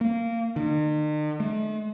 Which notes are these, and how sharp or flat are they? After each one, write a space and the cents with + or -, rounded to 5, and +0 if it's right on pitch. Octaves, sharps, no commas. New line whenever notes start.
A#3 -15
D#3 -45
A3 -45